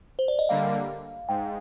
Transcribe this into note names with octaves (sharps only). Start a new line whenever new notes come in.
C5
D5
D#5
D3 G3 A#3 F5
G#2 G5